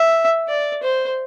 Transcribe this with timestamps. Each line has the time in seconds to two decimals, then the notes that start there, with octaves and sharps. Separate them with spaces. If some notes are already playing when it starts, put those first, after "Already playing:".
Already playing: E5
0.48 D5
0.83 C5